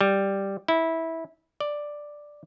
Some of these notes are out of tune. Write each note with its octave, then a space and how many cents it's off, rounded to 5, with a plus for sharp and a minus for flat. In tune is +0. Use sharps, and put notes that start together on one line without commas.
G3 +0
E4 -15
D5 +5